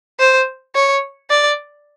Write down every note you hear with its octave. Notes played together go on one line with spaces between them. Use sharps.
C5
C#5
D5